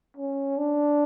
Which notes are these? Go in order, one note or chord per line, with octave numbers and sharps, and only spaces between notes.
C#4
D4